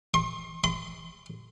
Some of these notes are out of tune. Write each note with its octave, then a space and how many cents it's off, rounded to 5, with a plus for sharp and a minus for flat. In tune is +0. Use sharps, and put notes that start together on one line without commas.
C6 +30
C6 -35